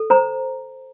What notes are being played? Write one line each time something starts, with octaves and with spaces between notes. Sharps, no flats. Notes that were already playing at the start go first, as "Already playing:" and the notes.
Already playing: A4
C5 A#5